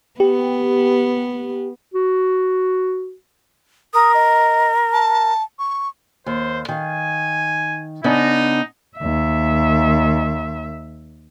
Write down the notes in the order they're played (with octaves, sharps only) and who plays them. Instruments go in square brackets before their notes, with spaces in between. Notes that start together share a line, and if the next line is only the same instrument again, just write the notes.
[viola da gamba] B3 [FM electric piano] G4
[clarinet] F#4
[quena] A#4 [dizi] D#6
[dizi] D#5
A5
C#6
[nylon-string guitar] D#2 [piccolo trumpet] C5
[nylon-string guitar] D#3 F5 [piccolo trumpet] G#5
[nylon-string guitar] C#3 B3 D4 [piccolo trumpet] D#4
[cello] D#2 E5